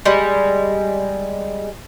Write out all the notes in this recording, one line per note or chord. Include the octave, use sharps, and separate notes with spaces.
G3 G#3